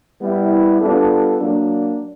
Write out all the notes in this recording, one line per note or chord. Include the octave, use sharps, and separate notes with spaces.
G3 B3 E4
G3 B3 D4 F4 A4
F#3 A#3 D4